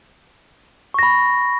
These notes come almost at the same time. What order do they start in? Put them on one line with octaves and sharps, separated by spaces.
C#6 A#6 B5